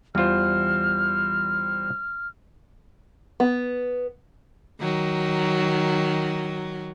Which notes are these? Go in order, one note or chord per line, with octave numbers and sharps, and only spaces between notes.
E2 G3 F4 C5 F6
B3
D#3 F#3